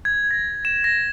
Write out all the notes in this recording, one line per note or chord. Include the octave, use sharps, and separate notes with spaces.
G#6
A#6
E7
A#6